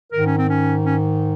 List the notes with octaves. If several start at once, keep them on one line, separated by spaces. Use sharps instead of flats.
G#2 D#3 A#4
C#4
C4
C#4
C#4